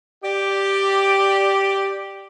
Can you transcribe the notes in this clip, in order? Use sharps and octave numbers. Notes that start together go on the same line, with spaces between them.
G4 D5